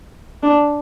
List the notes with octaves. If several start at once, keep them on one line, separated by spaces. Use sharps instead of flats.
D4